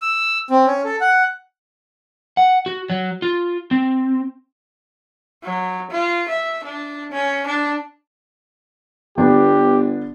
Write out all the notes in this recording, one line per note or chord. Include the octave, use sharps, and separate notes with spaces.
E6
C4
C#4
A4
F#5
F#5
F#4
F#3
F4
C4
F#3
F4
E5
D4
C#4
D4
G1 D3 B3 D4 G4